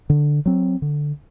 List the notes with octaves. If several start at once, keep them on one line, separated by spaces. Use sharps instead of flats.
D3
F#3 C4
D3